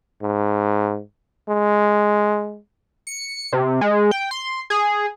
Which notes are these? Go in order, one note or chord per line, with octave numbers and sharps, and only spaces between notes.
G#2
G#3
C#7
C3
G#3
G5
C6
G#4